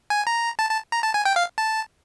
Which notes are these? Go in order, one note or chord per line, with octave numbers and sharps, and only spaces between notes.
G#5
A#5
A5
A5
A#5
A5
G#5
G5
F5
A5